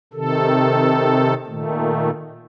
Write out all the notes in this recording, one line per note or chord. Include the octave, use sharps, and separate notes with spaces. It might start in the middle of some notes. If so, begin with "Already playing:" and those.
C3 D#3 A4
A#2 D#3 A3